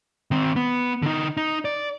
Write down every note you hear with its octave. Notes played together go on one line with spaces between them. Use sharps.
D#3 C4
B3
D3 D#4
D#4
D5